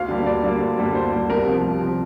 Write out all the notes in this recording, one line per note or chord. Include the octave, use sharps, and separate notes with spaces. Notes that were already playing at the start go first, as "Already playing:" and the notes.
Already playing: D2 F5
D3 G3 A#3
D2 D5
D3 G3 A#3
D2
D3 G3 A#3
D2 C5
D3 G3 A#3
C2 A#4
C3 F3
C2
C3 F3